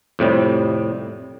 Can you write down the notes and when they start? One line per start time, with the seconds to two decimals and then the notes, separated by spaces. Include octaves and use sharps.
0.19 F2 A2 C3 G3